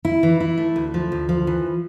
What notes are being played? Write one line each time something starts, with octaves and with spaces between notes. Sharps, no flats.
E4
E3
E4
A3
D2
F3
D2
F3
E3